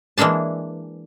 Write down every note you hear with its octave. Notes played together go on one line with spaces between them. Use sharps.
E3 G#3 A#3 D4 A5